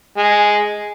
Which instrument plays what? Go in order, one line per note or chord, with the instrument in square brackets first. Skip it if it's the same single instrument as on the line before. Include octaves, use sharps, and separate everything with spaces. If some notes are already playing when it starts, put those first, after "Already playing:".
[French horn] G#3